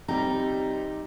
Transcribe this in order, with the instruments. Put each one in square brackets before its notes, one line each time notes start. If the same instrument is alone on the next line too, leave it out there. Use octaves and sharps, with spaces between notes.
[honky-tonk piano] C3 G3 [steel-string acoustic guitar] D#4 [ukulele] G4 A#5